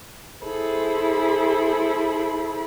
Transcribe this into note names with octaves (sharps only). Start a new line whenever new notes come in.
E4 G#4 A4 C5 B5